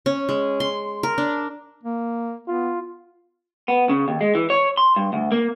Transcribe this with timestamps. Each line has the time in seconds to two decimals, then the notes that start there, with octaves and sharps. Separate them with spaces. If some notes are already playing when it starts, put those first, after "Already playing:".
0.06 C#4
0.29 G#3
0.60 C6
1.03 A#4
1.18 D4
1.83 A#3
2.48 B3 F4
3.68 B3
3.89 C#3
4.08 D#2
4.21 G#3
4.35 E3
4.50 C#5
4.77 C6
4.96 G2
5.13 D2
5.32 A#3